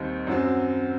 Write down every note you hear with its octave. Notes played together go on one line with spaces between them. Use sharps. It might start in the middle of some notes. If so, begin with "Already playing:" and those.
Already playing: D#2 D#3 G3 C4
F#2 F#3 C4